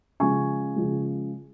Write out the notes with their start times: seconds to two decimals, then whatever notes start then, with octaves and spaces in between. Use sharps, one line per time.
0.20 C#3 F3 G#3 G#5 C#6
0.76 C#3 F3 G#3